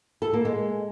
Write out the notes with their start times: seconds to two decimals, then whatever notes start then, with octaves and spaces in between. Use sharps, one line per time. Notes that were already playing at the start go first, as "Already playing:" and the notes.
0.22 A4
0.33 A#3
0.45 G#3